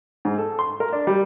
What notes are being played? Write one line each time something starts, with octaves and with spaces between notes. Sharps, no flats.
G#2
A4
C6
A#4
D4
G3